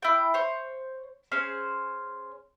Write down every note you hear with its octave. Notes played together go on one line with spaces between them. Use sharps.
E4 G5
C5 C#5
C#4 G#4 C5